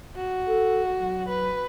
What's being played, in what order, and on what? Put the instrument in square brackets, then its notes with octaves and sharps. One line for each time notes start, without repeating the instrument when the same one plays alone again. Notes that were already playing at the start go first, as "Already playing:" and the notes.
[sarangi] F#4
[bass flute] A4
F#3
[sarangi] B4